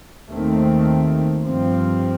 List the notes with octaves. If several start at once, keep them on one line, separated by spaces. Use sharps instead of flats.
D#2 D#3 A3 C4
G2 F3 C4